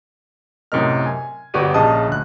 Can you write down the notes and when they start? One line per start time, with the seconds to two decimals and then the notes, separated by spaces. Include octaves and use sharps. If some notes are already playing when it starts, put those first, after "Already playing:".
0.72 F#2 A2 C3 A#4 D#5 F6
1.06 G#5
1.54 G1 B3 F#4 G4 D5 D#7
1.74 A#1 C#3 D#5 A5 D#6
2.08 D2 F#6